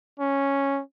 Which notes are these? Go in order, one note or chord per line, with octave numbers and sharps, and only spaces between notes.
C#4